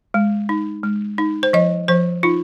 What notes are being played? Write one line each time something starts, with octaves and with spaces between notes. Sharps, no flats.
G#3
D#4
G#3
D#4
C5
F3 D#5
F3 C5
D#4 F4